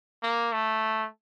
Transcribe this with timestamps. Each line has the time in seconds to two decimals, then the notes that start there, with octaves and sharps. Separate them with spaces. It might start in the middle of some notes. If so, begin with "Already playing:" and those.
0.23 A#3
0.53 A3